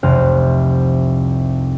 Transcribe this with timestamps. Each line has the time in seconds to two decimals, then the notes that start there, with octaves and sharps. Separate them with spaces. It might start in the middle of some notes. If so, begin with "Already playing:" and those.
0.03 F1 C2 C5 F6